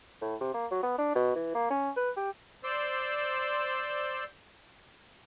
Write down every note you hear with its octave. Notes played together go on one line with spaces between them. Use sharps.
A2
C3
A#3
F#3
B3
D4
B2
E3
A#3
C#4
B4
G4
C5 D5 C6 E6